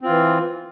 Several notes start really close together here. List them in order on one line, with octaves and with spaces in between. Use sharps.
C4 F4 E3